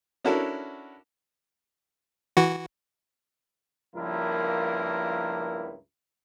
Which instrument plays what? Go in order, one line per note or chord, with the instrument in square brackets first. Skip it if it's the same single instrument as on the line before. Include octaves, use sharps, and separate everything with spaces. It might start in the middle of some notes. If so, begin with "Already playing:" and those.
[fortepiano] C#4 D4 E4 F#4 A4 A#4
[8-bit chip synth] E3 F#4
[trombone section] C#2 G2 F3 A#3 E4 A#4